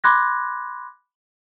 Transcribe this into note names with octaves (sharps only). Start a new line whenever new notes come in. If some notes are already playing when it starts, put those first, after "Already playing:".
B5 C6 D6 F#6 G#6 A#6